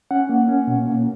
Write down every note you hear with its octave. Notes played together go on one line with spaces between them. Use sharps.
C#4 F#5
A#3
C#4
B2
A#3